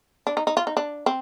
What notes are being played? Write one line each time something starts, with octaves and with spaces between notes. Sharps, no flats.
D4
D#4
D#4
F4
D#4
D4
C4